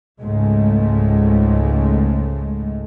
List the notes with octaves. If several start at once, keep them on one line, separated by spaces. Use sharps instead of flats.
C#2 G#2 G#3 A3